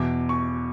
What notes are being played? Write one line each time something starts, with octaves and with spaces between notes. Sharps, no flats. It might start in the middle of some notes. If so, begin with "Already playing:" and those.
Already playing: E2 B2 D6
C#6